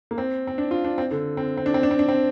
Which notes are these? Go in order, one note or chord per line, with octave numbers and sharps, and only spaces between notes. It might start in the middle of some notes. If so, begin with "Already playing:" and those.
A#3
C4
C4
D4
F4
D4
C4
D3
C4
C4
D4
C4
D4
C4
D4
C4